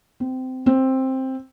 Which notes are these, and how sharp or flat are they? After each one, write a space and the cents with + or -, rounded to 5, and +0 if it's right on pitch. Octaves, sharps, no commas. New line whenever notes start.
C4 -20
C4 +10